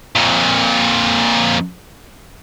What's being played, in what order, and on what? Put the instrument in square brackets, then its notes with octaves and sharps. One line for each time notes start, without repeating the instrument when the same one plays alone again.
[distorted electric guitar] F2 A#2